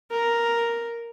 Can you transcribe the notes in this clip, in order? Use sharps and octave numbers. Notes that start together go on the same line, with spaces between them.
A#4